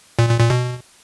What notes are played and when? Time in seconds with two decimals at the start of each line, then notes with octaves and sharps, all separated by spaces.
0.19 A#2
0.29 A#2
0.40 A#2
0.50 B2